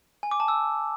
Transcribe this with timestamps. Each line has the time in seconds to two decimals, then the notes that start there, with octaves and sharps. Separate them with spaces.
0.23 G#5
0.31 D6
0.40 A5
0.48 E6